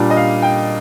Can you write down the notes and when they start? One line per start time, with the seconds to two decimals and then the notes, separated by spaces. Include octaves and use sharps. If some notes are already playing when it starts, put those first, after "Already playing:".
Already playing: A#2 G3 D4
0.10 D#5
0.16 F5
0.42 G5